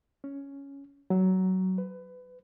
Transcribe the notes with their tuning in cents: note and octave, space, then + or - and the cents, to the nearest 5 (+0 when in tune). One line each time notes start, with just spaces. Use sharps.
C#4 +5
F#3 +15
B4 +25